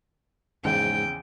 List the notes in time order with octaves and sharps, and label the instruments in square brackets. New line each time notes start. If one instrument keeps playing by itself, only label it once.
[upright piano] A#1 E2 C#3 [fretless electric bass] G#2 [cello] G5